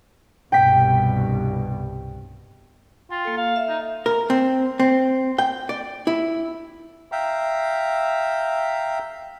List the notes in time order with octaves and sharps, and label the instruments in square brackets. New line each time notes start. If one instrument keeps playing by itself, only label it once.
[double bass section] C2 G2 B2 [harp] G5 B6
[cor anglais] F4 [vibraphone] G5
[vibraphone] A#3 A4
[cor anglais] F5
[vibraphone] E5
[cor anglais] D#4
[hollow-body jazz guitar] A#4
C4
C4
G5
D5
E4
[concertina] E5 F5 G5 A#5